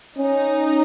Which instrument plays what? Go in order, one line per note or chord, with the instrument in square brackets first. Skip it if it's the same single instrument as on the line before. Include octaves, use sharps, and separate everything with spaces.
[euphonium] C#4 [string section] D#4